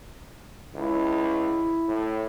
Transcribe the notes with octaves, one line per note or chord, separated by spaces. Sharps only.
C#2 E4
A2